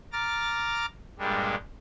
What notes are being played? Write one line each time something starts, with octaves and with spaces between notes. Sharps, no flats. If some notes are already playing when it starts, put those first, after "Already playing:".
A#5 D6 F6 A6
G2 A#2 G3 G#3 D4